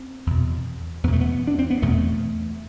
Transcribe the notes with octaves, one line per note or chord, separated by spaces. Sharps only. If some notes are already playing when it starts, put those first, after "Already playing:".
Already playing: C4
E2 B2
E2 B2 A3 B3
B3
D4
C4
B3
E2 B2 A3